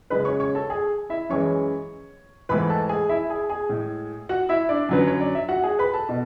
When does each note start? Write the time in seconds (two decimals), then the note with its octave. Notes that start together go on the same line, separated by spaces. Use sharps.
0.10 F#2 C#3 G#3 B4 B5
0.25 C#5 C#6
0.40 C#5 C#6
0.55 A4 A5
0.70 G#4 G#5
1.09 E4 E5
1.29 F#2 E3 G#3 C#5 C#6
2.49 G#2 E3 A3 B4 B5
2.69 A4 A5
2.89 G#4 G#5
3.09 E4 E5
3.30 G#4 G#5
3.49 G#4 G#5
3.69 A2 G#3
4.29 F#4 F#5
4.49 E4 E5
4.69 D4 D5
4.89 F#2 D3 F#3 B4
5.07 C#5
5.20 D5
5.35 E5
5.49 F#4 F#5
5.63 G#4 G#5
5.79 B4 B5
5.93 A4 A5
6.09 B2